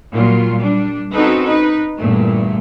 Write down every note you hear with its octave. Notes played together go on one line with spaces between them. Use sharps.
A#2 F#3 G3 F4
G3 D4
C4 C#4 D#4 F#4 A4 B4
D#4 B4
E2 G2 A#2 A3